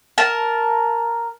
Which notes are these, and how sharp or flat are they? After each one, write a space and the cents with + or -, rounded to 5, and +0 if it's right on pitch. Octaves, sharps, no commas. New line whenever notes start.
A#4 +0 A5 -10